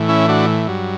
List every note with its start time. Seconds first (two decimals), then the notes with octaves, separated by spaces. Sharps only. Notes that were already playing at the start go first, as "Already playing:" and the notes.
Already playing: A2 E3
0.09 C#4 E4
0.28 D4 F#4
0.68 G2 F#3